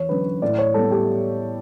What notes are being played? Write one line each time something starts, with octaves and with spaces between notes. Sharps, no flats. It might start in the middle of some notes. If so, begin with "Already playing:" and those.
Already playing: E2 C#5
D3 F#3 C#4 B4
A2 D5
C#5
G3 B3 A4
G4